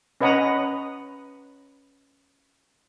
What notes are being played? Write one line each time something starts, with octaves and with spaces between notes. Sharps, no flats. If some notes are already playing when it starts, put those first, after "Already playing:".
C#4 B4 D#5 F#5 A#5 D#6